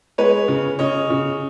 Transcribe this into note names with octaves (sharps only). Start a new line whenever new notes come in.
G#3 B4 C#5
C#3
C#3 C#5 D#5
C#3